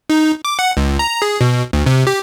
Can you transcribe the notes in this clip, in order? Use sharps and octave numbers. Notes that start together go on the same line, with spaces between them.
D#4
D6
F#5
C#2
A#5
G#4
B2
D2
C3
G4